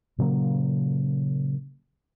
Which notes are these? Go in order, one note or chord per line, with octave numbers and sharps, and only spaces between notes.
A#2 C#3 F#3 A#3